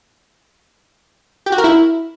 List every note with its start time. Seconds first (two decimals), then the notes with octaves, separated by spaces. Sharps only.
1.46 G4
1.52 F#4
1.58 A#4
1.64 E4